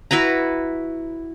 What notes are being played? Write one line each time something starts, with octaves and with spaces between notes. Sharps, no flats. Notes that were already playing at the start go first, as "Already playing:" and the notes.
E4 F#4 B4 A#5